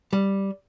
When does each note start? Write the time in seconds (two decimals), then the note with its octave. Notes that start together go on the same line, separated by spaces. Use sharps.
0.13 G3